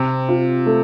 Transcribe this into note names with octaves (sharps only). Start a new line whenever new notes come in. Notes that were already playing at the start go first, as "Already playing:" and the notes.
Already playing: C3 C4
F4
A3